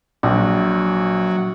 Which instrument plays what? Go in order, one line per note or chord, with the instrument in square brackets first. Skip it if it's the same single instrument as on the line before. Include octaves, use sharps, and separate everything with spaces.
[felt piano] A#1 [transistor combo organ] F#3